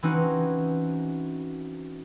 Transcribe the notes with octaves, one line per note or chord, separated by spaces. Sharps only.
E3 C4 C#4 D#4 F#4